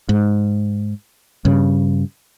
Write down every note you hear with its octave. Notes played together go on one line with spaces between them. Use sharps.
G#2
G2 C#3